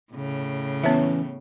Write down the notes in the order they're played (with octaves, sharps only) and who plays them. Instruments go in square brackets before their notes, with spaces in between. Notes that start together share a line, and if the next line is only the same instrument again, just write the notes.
[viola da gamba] A2 C#3
[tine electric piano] E3 C#4 [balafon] B3 C#5 E5